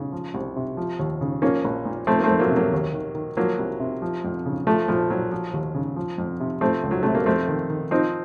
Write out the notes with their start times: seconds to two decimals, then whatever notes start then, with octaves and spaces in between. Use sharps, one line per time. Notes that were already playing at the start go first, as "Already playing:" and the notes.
Already playing: C#3
0.12 F3
0.34 C2
0.56 C3
0.77 F3
0.99 D#2
1.21 C#3
1.42 F3 A#3 C#4
1.64 A#1
1.85 A#2
2.07 F3 A3 C4
2.19 A#3
2.24 A3 C4
2.29 F2
2.39 F#3 A#3
2.50 C3
2.56 F#3 A#3
2.72 D#2
2.94 D#3
3.15 D#3
3.37 F3 F#3 A#3
3.59 C2
3.80 C3
4.02 F3
4.24 F2
4.46 C#3
4.67 F3 A3
4.88 A#1 F3
5.10 A#2 F#3
5.31 F3
5.53 D#2
5.74 C#3
5.96 F3
6.18 F2
6.40 C3
6.61 F3 A3 C4
6.83 C#2
6.91 F#3
7.03 C3 A3
7.15 A#3
7.26 F2 A3 C4
7.48 D#3
7.70 D#3
7.91 F3 C4 D#4